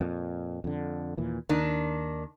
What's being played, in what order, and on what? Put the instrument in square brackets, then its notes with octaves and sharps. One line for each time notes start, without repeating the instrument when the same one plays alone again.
[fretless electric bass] F2 A#2
F2 D3
D#2 A#2 E3
[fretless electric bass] D#2 [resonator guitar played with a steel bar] D#3 D4